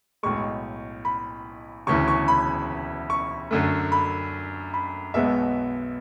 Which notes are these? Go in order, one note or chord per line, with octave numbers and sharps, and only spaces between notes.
B1 A2 G#3 C#6
B5
E1 D2 C#3 E3 C#6
C#6
B5
C#6
F#2 D3 A3
B5
B5
B1 B2 G#3 B3 E5